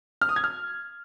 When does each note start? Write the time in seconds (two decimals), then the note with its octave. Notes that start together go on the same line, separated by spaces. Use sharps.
0.21 F6
0.29 D#6
0.36 G#6
0.44 F6